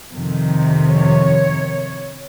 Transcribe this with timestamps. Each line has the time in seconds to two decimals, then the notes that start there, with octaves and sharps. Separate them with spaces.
0.13 F2 C3 D#3
0.88 C#5